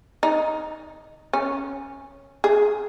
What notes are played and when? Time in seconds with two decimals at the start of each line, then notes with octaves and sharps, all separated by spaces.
0.23 D#4
1.33 C#4
2.44 G#4